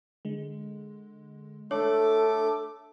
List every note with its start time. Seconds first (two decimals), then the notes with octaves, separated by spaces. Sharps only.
0.25 D3 G#3
1.71 A3 D4 A4 C#5 D6